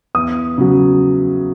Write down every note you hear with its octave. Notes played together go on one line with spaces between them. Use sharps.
E2 D#6
C#3 F#3